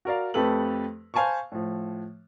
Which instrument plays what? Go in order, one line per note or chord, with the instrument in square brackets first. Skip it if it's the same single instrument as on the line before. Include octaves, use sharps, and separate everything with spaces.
[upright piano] F#4 A#4 D5 F5
F2 A3 G4 A4 B4 F#7
C5 F5 G#5 A5 B5 C#6
A2 F3